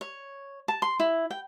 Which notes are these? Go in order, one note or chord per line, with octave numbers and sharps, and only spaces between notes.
C#5
A5
C6
E4
G5